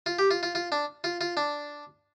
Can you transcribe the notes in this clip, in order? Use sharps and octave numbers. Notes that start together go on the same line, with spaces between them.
F4
G4
F4
F4
F4
D4
F4
F4
D4